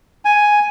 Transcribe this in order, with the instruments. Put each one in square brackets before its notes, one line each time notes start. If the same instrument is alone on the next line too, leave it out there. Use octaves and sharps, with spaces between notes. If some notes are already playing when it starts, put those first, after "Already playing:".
[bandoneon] G#5